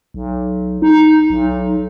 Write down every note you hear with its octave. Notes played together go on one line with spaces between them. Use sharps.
B1
D#4
B1